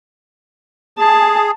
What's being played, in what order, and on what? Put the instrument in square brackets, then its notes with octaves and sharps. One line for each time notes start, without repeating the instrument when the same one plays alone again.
[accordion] G#4 [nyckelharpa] A5